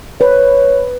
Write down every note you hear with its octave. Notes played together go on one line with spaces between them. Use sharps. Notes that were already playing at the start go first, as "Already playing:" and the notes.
B4 C#5